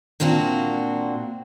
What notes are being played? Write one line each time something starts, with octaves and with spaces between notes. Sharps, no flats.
A#2 A#3 C4 D4 F#4